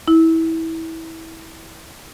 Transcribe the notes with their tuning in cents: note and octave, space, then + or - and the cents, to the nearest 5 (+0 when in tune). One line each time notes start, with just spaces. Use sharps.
E4 -20